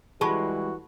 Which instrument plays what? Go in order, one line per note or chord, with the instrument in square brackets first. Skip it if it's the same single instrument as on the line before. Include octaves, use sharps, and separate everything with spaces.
[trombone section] E3 G3 F#4 [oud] G#3 [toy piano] A5 B5 C#6